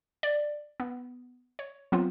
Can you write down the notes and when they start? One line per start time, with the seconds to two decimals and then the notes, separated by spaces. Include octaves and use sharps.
0.23 D5
0.80 B3
1.59 C#5
1.92 F#3 B3 C4 F4